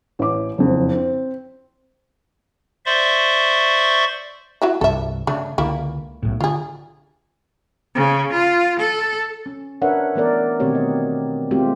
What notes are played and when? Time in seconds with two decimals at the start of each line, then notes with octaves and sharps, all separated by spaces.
0.19 A1 D6
0.58 F#1 F2
0.95 C4
2.86 C5 D5 E5 C6 C#6
4.62 E4 F#4 E5
4.81 C2 G2 A4 E5
5.27 C#3 A3 D4
5.58 C#2 D3 A#3 E4
6.23 B1 A2
6.41 D3 F4 G#4
7.95 C#3
8.33 F4
8.80 A4
9.46 C#4
9.82 D4 A#4 B4 C#5 E5 F#5
10.15 E3 A3 B3 A#4 D5
10.60 B2 D#3 A3 C4 G4 C#5
10.75 D#5
11.51 G#3 A3 C4 F4 G4